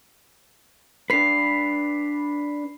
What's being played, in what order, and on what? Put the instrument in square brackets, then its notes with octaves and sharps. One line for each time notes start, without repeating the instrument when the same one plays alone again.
[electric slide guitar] D4 B4 [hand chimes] B5 C7